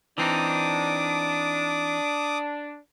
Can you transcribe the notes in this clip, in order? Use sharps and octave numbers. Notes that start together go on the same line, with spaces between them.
E3 C4 D4 D#4 D6 D#6